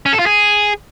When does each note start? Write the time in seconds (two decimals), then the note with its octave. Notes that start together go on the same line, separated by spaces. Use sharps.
0.06 C#4
0.13 A4
0.19 F4
0.26 G#4